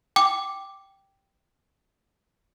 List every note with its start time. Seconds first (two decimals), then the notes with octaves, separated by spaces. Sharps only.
0.16 G5 D6